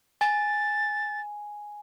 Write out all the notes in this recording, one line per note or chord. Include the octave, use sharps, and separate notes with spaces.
G#5 A6